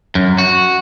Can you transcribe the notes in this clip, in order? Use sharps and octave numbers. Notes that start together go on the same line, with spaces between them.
F#2
F#4